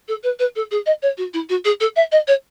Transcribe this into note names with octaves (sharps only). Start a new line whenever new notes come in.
A4
B4
B4
A4
G#4
D#5
C#5
F#4
E4
F#4
G#4
A4
E5
D#5
C#5